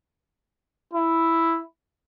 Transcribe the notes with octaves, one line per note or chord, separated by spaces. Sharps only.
E4